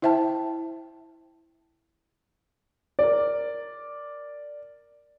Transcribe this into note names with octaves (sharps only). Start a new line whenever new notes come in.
E4 C5 E5 G5 A5
A#4 D5